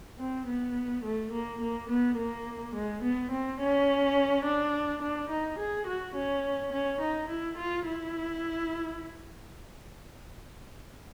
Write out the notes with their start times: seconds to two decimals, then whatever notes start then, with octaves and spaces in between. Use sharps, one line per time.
0.19 C4
0.47 B3
1.04 A3
1.32 A#3
1.61 A#3
1.89 B3
2.17 A#3
2.75 G#3
3.03 B3
3.31 C4
3.60 C#4
4.45 D4
5.02 D4
5.30 D#4
5.59 G#4
5.87 F#4
6.16 C#4
6.72 C#4
7.01 D#4
7.29 E4
7.58 F4
7.86 E4